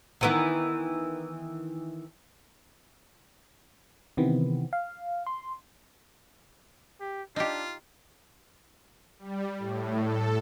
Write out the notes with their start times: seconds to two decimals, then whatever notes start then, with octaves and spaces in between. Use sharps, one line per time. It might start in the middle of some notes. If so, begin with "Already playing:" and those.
0.21 D#3 E3 B3
4.17 C3 D#3 E3 B3 C4
4.73 F5
5.26 C6
7.01 G4
7.36 D4 D#4 F4 G4
9.19 G3
9.59 A2
10.01 A4